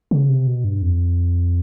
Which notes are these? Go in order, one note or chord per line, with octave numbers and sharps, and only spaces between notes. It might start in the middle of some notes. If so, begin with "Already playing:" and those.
C#3
C3
B2
G2
F2